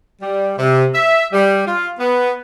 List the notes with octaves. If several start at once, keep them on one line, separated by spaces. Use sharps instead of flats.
G3
C3
E5
G3
F4
B3